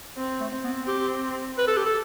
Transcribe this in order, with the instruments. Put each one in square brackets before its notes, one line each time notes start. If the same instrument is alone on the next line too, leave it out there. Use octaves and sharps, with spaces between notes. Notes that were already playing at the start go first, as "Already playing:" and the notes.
[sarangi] C4
[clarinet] A3
[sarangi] C4
[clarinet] B3
G4
B4
A4
G4
A4